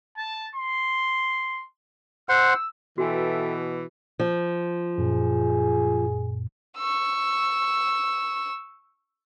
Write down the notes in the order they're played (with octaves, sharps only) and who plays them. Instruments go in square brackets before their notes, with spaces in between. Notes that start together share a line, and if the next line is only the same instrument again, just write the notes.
[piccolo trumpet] A5
C6
[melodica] C5 F#5 C6 [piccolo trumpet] E6
[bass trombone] B2 [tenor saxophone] E3 [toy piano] F#4 G#5 [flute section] A4 E5 G5
[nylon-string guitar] F3
[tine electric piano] F#2 A#2 [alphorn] G#4
[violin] C#6 E6